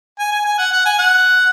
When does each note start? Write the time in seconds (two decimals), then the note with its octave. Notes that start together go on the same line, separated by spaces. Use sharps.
0.19 G#5
0.32 G#5
0.45 G#5
0.58 F#5
0.72 F#5
0.86 G#5
0.99 F#5